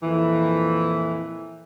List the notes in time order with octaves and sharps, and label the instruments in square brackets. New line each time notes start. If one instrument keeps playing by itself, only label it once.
[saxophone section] F2 A#2 E3